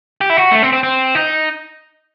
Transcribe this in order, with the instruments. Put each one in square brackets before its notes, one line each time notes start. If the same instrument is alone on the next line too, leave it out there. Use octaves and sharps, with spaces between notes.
[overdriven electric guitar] G4
E4
F#4
A3
C4
C4
C4
D#4